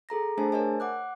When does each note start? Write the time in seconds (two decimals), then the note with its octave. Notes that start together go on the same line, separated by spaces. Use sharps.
0.09 G#4 A4 A#5 A#6
0.37 A3 D4 G#4 C5 G#5 A5
0.52 A#4 C#5 D#5 G#5
0.80 F#5 D6 F#6